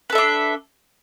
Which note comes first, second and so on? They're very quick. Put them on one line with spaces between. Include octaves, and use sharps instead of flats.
B4 A4 E5 D4